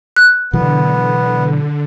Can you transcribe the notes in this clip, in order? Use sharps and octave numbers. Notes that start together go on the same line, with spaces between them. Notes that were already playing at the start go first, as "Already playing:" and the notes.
F#6
B2 D3 E3 F#3 B3